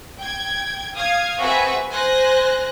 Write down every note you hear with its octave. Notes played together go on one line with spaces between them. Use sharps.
G5 G#6
F5 D#6 G#6
C4 F#4 G#4 B4 E5
C5 G#5 F#6 A#6